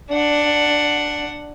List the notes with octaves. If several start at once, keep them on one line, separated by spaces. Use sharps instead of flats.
D4 F#5